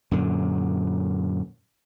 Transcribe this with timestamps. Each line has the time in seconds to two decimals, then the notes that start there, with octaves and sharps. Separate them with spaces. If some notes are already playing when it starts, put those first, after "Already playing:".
0.11 F#2 A#2 D3